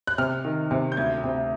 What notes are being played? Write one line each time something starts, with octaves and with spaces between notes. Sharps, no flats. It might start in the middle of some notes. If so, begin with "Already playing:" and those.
F#6
C3 F6
D#3
C3
G6
D2 G#6
C3